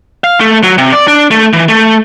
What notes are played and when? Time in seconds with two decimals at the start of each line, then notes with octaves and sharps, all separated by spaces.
0.24 F5
0.40 A3
0.63 F#3
0.78 C3
0.93 D5
1.08 D4
1.31 A3
1.53 E3
1.69 A3